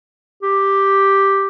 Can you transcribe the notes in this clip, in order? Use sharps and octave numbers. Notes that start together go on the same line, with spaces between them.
G4